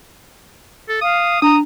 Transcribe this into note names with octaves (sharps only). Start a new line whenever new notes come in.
A4
F5 D#6
D4 A#5 D#6